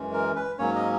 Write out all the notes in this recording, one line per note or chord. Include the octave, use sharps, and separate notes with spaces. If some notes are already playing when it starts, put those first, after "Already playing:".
Already playing: F#2 E3 G#3 C#4
A#4
B4
G#2 F#3 A#3 C#4 C#5
D#5